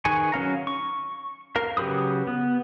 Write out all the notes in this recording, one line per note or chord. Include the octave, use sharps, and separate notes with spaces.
D#3 G#4 B4 G#5 C#6
F#3 C#4 F5 A#5
C#6
A#4 F5
C#3 F#3 G4 B4 D#6
B3